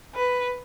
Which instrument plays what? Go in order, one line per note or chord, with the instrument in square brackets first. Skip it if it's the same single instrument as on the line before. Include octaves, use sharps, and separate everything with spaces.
[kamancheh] B4